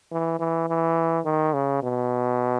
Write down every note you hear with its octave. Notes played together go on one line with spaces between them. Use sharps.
E3
E3
E3
D#3
C#3
B2